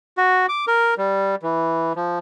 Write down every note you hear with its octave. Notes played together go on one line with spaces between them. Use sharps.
F#4
D6
A#4
G3
E3
F3